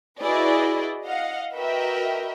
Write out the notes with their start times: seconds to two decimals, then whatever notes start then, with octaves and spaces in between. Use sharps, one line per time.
0.20 E4 F#4 G#4 B4 D5 D#5
1.05 D#5 F5 F#5
1.56 F#4 A#4 B4 D#5 E5 G5